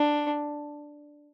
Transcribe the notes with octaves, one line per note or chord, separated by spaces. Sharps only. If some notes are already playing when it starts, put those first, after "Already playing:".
Already playing: D4